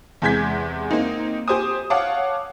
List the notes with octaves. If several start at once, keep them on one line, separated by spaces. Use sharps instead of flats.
E2 C3 G#3 G6 G#6 B6
A#3 C4 D#4
G4 C5 G#5 D#6
C#5 F5 F#5 A5 D6